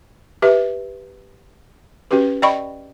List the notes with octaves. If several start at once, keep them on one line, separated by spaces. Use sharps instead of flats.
G4 B4 E5
C#4 F#4 G4 B4
D5 D#5 G5 B5 C#6